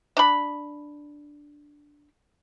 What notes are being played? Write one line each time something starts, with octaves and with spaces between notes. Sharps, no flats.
D4 B5